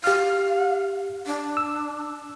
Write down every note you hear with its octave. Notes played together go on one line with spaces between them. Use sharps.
G4 F5 F6
D4
E6